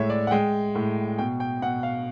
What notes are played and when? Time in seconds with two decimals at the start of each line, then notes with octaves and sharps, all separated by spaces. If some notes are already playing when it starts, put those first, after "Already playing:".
Already playing: A2 G#3 C#5 E5
0.10 D5
0.27 F#5
0.31 G#3 G5
0.75 A2
1.18 B2 G5
1.40 G5
1.62 B2 F#5
1.83 F5